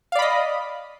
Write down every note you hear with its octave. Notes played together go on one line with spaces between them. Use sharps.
D5 D#5 F5 B5